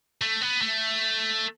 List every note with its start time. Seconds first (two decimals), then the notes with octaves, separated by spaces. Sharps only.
0.21 A3
0.41 B3
0.62 A3